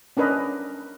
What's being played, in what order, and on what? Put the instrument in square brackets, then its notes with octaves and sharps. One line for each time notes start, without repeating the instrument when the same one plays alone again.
[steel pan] C#4 D4 A#4 B4 D#5